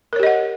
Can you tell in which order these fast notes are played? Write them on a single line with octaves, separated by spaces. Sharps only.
A#4 C#5 G4 D#5 F#5